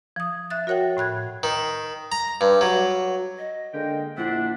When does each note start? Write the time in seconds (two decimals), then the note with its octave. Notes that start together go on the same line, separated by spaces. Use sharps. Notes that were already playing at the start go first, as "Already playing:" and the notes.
0.16 F3 D#6
0.50 E5 F#6 A6
0.67 F#4 A#4 C#5 F#5 G5
0.97 A2 B5 F#6 G#6
1.43 D#3
2.12 A#5
2.41 G2
2.61 F#3
3.38 D#5
3.74 D3 G#3 A#3 G5
4.17 A#1 D4 E4 C5 E5 F#5